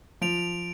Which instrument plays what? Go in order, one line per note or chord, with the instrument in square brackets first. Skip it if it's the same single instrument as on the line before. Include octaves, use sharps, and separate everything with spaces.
[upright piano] F3 [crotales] D7 F7